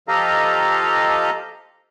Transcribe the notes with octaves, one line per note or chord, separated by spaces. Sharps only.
F3 G4 A4 D#5 F5 A#5